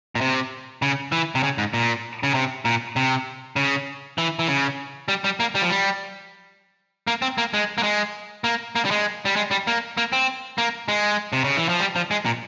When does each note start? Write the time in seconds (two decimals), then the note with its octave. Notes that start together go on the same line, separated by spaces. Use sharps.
0.15 A#2
0.21 C3
0.82 C#3
1.12 E3
1.35 C3
1.43 C#3
1.58 G#2
1.74 A#2
2.23 C#3
2.34 C3
2.65 A#2
2.96 C3
3.56 C#3
4.18 E3
4.39 E3
4.48 C#3
5.08 G3
5.24 G3
5.40 A#3
5.55 G3
5.62 F3
5.70 G3
7.07 A#3
7.22 C4
7.38 A#3
7.54 G#3
7.78 A#3
7.83 G#3
8.44 A#3
8.76 A#3
8.85 G3
8.91 G#3
9.25 G3
9.36 G#3
9.51 G3
9.67 A#3
9.97 A#3
10.13 C4
10.58 A#3
10.88 G#3
11.33 C3
11.44 C#3
11.57 E3
11.69 F3
11.80 G3
11.96 F3
12.11 G#3
12.25 A#2